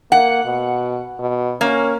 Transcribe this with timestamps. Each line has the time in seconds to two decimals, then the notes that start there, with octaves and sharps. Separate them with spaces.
0.12 A#3 F#5
0.45 B2
1.19 B2
1.61 A#3 C#4